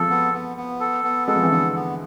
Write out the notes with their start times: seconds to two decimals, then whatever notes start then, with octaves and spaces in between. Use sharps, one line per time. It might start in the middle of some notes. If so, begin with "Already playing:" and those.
Already playing: F3 G#3 A4
0.10 B3
0.33 B3
0.57 B3
0.80 A4
1.04 B3
1.28 G#3 A4
1.36 F3
1.43 E3
1.51 D3 B3
1.75 B3